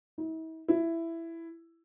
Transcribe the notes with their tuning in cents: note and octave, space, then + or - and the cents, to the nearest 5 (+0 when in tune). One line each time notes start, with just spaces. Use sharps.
E4 -45
E4 +10